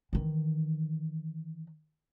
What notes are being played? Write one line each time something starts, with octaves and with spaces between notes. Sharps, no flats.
D#3 E3